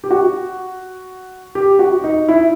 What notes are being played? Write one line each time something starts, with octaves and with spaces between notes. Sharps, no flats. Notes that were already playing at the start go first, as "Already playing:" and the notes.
G4
F#4
G4
F#4
D#4
E4